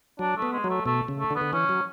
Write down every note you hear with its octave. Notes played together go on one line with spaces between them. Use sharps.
F#3 D4
A3
B3
G#3
F#3
A3
B2 A3
C#3
A3
D3
B3
D3
E3 C#4
F#3